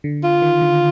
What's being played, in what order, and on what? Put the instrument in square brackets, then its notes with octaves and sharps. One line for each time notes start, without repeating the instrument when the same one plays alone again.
[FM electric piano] D3
[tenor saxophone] F4
[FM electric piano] D#3
D3